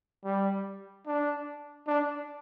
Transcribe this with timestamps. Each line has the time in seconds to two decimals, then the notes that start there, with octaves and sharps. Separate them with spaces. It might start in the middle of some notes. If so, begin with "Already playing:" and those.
0.24 G3
1.07 D4
1.87 D4